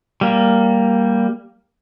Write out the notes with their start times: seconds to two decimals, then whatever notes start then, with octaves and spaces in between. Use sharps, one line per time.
0.21 G3 A#3